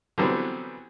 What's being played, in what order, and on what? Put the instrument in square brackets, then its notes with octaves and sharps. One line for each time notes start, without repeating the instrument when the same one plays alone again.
[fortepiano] D3 E3 F#3 G3 B3 C4